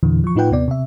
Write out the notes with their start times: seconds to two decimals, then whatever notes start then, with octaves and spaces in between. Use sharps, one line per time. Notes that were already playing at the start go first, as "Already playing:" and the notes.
0.03 E2 A#2 D3 E3
0.24 F3 C#6
0.36 A2 D#4 F4 B4 F#5 G5
0.51 D#2 C3 B3 D5
0.68 C3 E5